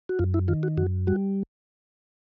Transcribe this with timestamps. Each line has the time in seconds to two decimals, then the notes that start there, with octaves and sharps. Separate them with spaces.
0.09 F#4
0.19 F#2 F4
0.34 E4
0.48 D#3 F4
0.63 F#4
0.77 F#2 F#4
1.07 G3 F#4